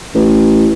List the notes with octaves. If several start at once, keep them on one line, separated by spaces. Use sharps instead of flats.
A1